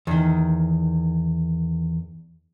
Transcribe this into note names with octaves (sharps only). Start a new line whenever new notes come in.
E2 D#3